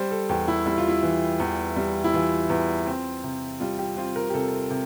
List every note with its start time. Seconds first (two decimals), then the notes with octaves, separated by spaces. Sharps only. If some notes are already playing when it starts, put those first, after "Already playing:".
Already playing: G3 C5
0.11 A4
0.29 E2 G4
0.48 E4
0.66 G3 E4
0.78 F4
0.88 E4
1.03 E3
1.40 E2
1.76 G3
2.04 E4
2.13 E3 F4
2.50 E2
2.87 C4
3.24 C3
3.60 G3 F4
3.79 G4
3.97 C4 F4
4.16 A#4
4.30 G4
4.34 C3 A4
4.70 C3